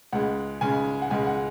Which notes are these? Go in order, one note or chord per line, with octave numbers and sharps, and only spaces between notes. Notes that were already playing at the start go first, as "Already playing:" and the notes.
C#2 C#3 G#3 F#5
C#2 C#3 G#3 G#5
F#5
C#2 C#3 G#3 G#5
F#5